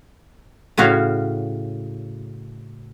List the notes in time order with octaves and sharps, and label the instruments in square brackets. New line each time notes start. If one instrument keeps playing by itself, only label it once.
[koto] A2 C#3 C#4 F#4 F5